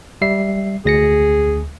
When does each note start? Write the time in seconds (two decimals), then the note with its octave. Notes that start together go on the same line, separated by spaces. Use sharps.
0.22 G3 E5 C7
0.85 D2 G#4 A#6 C#7